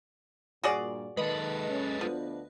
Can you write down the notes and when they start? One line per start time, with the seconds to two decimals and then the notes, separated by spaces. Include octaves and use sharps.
0.64 G2 A#2 F#4 G#4 D5
1.17 D#3 G#3 A4 B4 D#5
1.69 C#4
2.01 D2 F3 B3 D4